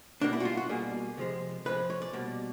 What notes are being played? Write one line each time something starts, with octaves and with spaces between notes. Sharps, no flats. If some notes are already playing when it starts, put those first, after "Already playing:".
B2 G3 A#3 D4
E4
F#4
F4
F#4
B2 G3 A#3 G#4
C3 F3 G#3
C3 F3 G#3 B4
C#5
D5
B2 G3 A#3